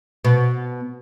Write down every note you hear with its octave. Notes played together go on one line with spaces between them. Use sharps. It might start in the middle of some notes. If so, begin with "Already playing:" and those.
B2